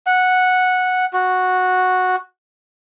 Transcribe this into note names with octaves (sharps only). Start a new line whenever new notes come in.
F#5
F#4